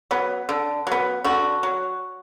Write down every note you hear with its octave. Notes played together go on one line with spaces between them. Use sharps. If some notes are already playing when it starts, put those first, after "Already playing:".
F#3 B3
D3
F#3 B3
D3 F#4
F#3